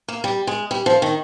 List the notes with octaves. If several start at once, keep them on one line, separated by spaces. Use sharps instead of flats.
A#3
G3
G#3
G3
F3
D#3